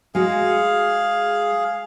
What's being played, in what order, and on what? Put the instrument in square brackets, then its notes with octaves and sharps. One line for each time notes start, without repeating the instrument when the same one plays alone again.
[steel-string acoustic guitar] G#3 F#4 [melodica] G#4 F5